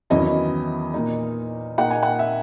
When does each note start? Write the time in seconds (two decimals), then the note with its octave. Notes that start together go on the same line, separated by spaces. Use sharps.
0.10 E2 D#3 F#3 C#4 E4 D#5
0.94 A#2 A#3 D#4
1.77 A#2 A#3 D#4 F#5
1.90 G#5
2.03 F#5
2.19 E5